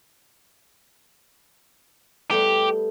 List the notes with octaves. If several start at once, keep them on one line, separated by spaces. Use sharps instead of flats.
G3 A3 B3 G4